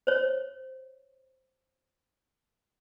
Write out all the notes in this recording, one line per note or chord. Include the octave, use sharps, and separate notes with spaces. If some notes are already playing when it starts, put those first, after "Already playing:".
C5 C#5